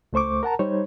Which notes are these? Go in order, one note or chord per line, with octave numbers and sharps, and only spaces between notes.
C#2 A3 C5 C#6 D6
A#4 F#5 A5 A#5
G3 D#4 C5 C#5